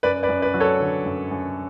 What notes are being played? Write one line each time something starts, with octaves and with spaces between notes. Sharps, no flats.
F#2 B4 D5
B4 D5
F#2
B4 D5
F#3
A4 C#5
D3
F#2
F#2